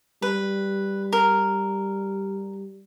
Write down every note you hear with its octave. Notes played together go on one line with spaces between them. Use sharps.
G3 B4
A#4